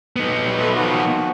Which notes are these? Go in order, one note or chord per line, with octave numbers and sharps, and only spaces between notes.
B3 D#4
G3
A3 A4 B4
D#3 F3 F#4